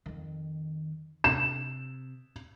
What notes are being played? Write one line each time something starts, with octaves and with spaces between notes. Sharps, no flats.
F2 D#3
C3 E7